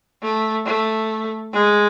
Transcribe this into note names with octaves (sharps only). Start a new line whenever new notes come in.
A3
A3
G#3